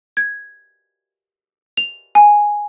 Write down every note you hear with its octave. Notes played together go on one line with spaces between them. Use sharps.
G#6
F7
G#5